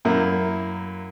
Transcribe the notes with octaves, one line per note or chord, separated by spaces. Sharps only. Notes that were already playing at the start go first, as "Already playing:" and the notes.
F#2 A#3 E4